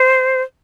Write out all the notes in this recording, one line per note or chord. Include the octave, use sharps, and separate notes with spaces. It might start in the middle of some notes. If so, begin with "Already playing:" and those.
Already playing: C5